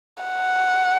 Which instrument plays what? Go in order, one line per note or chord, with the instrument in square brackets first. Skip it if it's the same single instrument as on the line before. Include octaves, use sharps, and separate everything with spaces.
[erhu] F#5